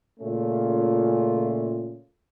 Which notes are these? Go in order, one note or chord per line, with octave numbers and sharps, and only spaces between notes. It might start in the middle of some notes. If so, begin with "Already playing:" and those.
A#2 C#3 A3 C#4 F4